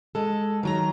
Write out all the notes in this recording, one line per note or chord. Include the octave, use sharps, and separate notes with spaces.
G#3 A4
D#3 F#3 A#5